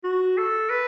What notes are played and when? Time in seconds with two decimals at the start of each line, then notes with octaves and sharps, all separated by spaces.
0.04 F#4
0.37 A4
0.70 B4